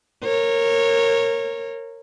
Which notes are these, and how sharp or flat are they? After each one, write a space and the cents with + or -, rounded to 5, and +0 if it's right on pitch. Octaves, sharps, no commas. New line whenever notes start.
A#4 -15 C#5 -20